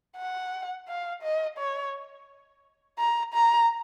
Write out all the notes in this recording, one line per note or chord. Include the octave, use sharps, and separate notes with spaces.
F#5
F5
D#5
C#5
A#5
A#5